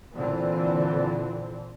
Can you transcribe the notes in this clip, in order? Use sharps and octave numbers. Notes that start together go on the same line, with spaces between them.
A#2 D3 E3 C4